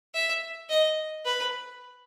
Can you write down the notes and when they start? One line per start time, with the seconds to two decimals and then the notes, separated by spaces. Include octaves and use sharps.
0.14 E5
0.69 D#5
1.25 B4